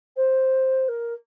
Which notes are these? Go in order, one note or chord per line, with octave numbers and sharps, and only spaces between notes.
C5
A#4